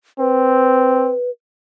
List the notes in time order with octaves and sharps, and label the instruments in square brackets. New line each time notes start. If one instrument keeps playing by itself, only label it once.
[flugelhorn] C4 [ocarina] B4